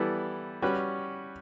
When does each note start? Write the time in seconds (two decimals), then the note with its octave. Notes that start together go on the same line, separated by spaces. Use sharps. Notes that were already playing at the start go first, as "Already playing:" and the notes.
Already playing: E3 G3 B3 E4 A4
0.62 G3 C#4 F#4 B4